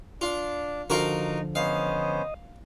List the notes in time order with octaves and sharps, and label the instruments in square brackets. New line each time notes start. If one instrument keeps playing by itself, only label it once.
[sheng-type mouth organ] D4 [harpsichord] F4
[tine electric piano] D3 F3 [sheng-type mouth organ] D#4 [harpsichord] F4 F#4 A#4
[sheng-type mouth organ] B3 C#4 C5 [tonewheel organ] D#5 [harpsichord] F5